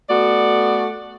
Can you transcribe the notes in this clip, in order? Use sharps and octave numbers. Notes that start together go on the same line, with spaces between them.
A3 B3 F#4 D5